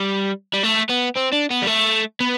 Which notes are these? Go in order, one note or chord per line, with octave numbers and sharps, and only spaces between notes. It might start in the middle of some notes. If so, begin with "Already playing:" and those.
Already playing: G3
G3
A3
B3
C4
D4
B3
G3
A3
B3